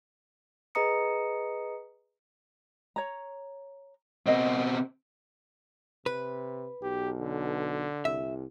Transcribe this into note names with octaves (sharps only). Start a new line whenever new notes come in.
G#4 B4 D#5 A#5 D#6 C#7
C#5 A#5
B2 C4 A#4 D#5
C3 B4
B1 G4
D3
C2 E5